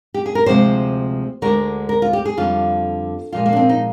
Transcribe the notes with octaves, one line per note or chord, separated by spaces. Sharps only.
G4
G#4
A#4
D2 C3 F3 G#3 C5
D2 D3 G#3 A#4
A#4
F4
G4
G#4
F2 D3 G3 F4
A#2 F3 G#3 F4
A#3
D4
C4
D#4